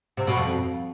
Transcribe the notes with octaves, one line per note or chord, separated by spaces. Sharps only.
C3
B2
F2